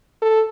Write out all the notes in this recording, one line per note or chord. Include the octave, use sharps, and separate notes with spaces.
A4